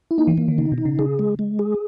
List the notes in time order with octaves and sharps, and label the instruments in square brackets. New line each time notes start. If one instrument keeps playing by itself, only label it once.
[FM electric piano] E4
[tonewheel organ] A#3 [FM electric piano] D#4
[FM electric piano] E3
[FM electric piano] E3 [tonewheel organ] A#3
[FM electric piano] D#3
[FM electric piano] C#3 [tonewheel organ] D#4
[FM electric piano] B2
[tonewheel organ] D#4
[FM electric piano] C#3
[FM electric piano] C#3 [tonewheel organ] G#4
[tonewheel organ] G#3
G#3
G#4